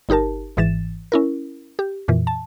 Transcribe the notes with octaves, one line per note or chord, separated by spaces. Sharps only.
G1 D#4 G4 A#4 A5
G#1 G#2 E3 A6 E7
C#4 E4 A#4
G4
F2 A#2 E3
A5